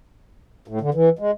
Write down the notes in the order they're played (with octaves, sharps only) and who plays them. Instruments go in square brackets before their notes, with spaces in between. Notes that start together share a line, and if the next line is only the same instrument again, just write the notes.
[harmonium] A2
D3
E3
G#3